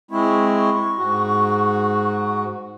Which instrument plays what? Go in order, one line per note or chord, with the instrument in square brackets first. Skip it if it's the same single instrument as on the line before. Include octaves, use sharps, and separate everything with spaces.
[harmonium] G#3 C4 E4 [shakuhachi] C#6
[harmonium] G#2 F#4